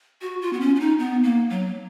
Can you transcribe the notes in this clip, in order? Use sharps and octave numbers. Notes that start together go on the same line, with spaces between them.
F#4
F4
B3
C#4
C#4
D#4
B3
A#3
F#3